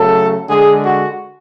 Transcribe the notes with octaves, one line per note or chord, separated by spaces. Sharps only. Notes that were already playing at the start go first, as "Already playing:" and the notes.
Already playing: C#3 F#3 A3 A4
D3 G#3 G#4
F#4